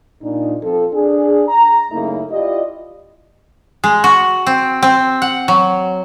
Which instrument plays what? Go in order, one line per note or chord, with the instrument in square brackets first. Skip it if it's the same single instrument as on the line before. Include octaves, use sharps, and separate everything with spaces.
[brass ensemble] A#2 D4 D#4
F3 C4 A4
D4 G#4
A#5
F#2 C#3 A3 A#3 D#4 E4
E4 F4 G4 D5 D#5
[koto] G#3
F#4
C4
C4
F#5
F#3